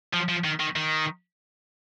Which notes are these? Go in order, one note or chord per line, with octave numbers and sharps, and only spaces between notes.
F3
F3
D#3
D#3
D#3